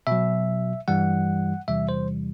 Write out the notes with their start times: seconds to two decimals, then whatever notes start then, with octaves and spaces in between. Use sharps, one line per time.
0.07 B2 F#3 E5
0.88 G2 E3 G3 F#5
1.68 E2 C3 E3 G3 E5
1.89 C5